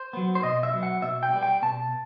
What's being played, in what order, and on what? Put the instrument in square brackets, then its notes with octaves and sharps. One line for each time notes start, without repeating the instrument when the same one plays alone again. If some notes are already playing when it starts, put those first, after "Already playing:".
Already playing: [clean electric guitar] C5
F#3 B3
C5
B2 D#5
E5
F#3 B3
F#5
B2 E5
G5
G3 B3
G5
B2 A5